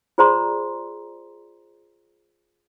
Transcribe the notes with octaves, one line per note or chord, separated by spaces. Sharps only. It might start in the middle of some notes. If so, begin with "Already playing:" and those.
F4 G#4 C5 D5 A#5 C6